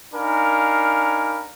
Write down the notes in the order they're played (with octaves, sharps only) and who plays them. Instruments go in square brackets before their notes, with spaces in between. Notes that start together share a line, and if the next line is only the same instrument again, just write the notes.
[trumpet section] D4 D#4 A#4 F5 G#5 B5